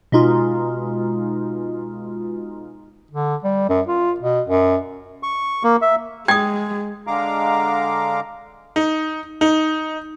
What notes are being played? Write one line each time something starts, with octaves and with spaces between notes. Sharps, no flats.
B2 G#3 D#4 F4
D3
G3
F#2
F4
B2
F#2
C#6
A#3
E5
G#3 G5 D#6 G#6
D3 G#3 F5 A#5 D6
D#4
D#4